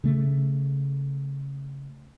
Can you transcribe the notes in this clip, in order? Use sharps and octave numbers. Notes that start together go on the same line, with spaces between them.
C#3 A3